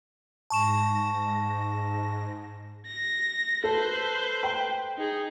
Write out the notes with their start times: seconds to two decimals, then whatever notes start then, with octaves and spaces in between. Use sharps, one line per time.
0.50 G#2 A5 C#6 A#6 E7
2.87 A#6
3.64 A4 B4 C5
4.43 G5
4.98 D#4 G#4